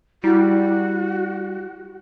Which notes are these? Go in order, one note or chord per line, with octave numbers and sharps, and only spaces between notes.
G3 E4 F#4